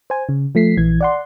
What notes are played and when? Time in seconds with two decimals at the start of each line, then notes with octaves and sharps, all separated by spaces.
0.10 C5 G#5
0.29 C#3
0.55 F3 A3 B6 C7
0.77 A#1 E3 G#6
1.01 D5 F#5 C6